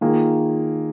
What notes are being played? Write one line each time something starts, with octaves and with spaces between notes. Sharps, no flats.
D#3 A#3 F4 G#4